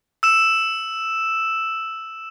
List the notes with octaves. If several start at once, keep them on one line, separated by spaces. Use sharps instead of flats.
E6 E7